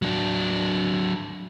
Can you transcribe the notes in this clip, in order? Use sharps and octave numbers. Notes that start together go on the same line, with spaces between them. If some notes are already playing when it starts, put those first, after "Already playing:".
F#3 D4